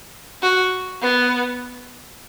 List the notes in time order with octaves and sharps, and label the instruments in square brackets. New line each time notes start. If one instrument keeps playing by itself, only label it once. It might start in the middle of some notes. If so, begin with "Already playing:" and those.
[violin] F#4
B3